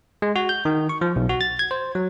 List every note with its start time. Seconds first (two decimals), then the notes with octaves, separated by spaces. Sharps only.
0.22 G#3
0.36 F#4
0.49 G6
0.65 D#3
0.89 C#6
1.01 F3
1.16 B1
1.29 F#4
1.41 A6
1.59 G#6
1.71 C5
1.95 F#3